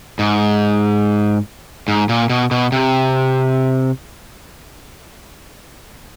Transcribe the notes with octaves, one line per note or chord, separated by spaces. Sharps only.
G#2
G#2
A#2
B2
B2
C3